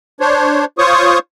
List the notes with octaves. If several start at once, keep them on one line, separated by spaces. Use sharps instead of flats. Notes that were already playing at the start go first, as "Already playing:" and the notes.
D4 C5 C#5
F4 C5 C#5 C#6 D#6